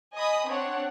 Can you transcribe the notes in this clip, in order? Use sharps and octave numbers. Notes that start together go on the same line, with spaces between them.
D#5 G#5 B5 D#6
C4 D4 C#5 F#5